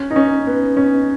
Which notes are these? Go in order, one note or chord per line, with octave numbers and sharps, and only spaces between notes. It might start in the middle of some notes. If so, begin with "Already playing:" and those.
Already playing: C#4
D#4
C#4
B3
C#4